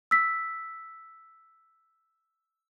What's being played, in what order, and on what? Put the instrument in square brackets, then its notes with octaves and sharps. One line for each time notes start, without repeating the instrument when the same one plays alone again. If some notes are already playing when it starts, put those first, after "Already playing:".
[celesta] E6 B6